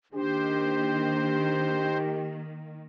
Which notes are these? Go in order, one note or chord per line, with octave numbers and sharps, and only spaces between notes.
D#3 A#3 D4 G4 C5